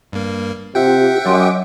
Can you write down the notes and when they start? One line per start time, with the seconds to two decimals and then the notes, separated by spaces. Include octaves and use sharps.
0.12 G2 A#3
0.75 C3 F4 G4 E5 F#5 G5
1.25 F#2 F#3 D#5 C6 D6